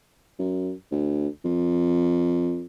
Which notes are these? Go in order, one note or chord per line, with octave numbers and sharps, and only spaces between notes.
F#2
D2
F2